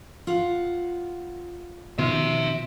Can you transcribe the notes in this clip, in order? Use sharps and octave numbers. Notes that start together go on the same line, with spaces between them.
F4 F#5
B2 D#3 F3 E5 C6